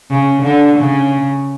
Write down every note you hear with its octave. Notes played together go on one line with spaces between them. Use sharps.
C#3
D3
C#3